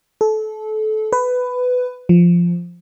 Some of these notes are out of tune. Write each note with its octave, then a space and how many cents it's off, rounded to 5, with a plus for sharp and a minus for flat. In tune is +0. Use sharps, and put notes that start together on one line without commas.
A4 -25
B4 +15
F3 -5